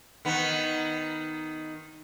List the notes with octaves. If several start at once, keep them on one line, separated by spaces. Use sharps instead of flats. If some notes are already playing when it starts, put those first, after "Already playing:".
D#3 B3